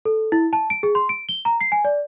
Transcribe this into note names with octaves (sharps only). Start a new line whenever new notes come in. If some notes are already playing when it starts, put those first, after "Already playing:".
A4
E4
A5
D7
G#4
C6
D7
G7
A#5
C7
G#5
D5